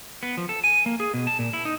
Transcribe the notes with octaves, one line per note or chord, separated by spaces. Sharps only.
B3
F3
A4
G#5
A#3
G#4
B2
A5
A#2
E4
D#4